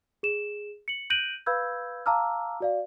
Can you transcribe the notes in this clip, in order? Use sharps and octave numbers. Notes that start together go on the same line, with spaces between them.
G#4 E7
C#7 F#7
F#6 G6 A#6 D7 D#7 F#7
B4 F5 B5 E6 G6 G#6
F5 A5 A#5 D6 E6 F6
F#4 D5 F5